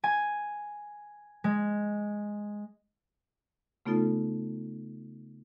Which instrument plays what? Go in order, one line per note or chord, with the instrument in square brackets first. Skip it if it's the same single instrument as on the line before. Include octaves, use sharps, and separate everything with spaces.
[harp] G#5
G#3
[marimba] C#3 A3 B3 D#4 F4 A4